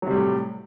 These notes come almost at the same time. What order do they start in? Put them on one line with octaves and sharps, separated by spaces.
F#3 C3 G3 A2